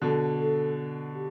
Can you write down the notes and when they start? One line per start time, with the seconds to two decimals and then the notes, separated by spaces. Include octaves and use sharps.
0.02 B2 D3 A4
0.39 A4
1.14 G4